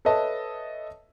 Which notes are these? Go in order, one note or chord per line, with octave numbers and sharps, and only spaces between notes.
A4 B4 C#5 D#5 E5 A5